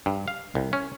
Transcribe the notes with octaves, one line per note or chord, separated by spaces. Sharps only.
G2
F5
C2
C#4